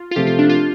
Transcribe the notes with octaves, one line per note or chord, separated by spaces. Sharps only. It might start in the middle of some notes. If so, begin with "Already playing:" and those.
Already playing: F4
F4
C3 F3 A3 G4
F4
D4
F4